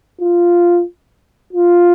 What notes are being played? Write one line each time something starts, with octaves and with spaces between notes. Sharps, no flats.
F4
F4